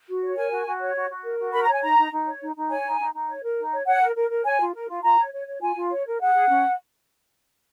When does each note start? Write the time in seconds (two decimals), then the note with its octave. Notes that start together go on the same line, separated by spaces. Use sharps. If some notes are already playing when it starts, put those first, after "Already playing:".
0.08 F#4
0.22 C#5
0.37 A#4 G#5
0.52 F#4
0.66 F#4
0.81 C#5
0.95 F#4
1.09 F#4
1.25 A#4
1.39 F#4
1.54 A#4 B5
1.63 A#5
1.68 C#5
1.73 G#5
1.83 D#4 A#5
1.98 D#4
2.12 D#4
2.27 C#5
2.41 D#4
2.56 D#4
2.70 C#5 G#5
2.85 D#4
3.00 D#4
3.14 D#4
3.29 C#5
3.44 A#4
3.58 D#4
3.73 C#5
3.87 C#5 F#5
4.02 A#4
4.16 A#4
4.31 A#4
4.45 C#5 G#5
4.60 F4
4.74 A#4
4.89 F4
5.03 F4 A#5
5.18 C#5
5.33 C#5
5.48 C#5
5.62 F4 G#5
5.77 F4
5.91 C#5
6.06 A#4
6.21 G#4 F#5
6.35 G#4
6.49 C#4